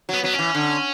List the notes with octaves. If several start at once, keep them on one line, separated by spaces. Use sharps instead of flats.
F#3 B3
F#3 B3
C#4
E3
D3